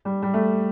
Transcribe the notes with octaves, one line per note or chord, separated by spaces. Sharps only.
G3
G3
A3